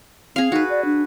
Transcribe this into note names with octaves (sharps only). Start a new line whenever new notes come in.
C4 G#4 F5
D#4 F#4 B4
D5
D4